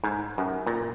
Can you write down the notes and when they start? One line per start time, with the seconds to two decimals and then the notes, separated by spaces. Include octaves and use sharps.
0.04 G#2
0.38 F#2
0.66 A#2